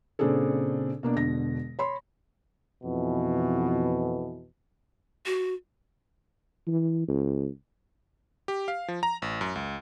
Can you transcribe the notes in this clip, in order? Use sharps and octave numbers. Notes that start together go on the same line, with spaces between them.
A#2 C#3 C4 D4 G#4 A4
B2 A#3 D4
E1 B2 D3 A#6
C#5 B5 C6
F2 B2 E3
F#4
E3
C#2
G4
F5
F3
A#5
A1
F#2
C#2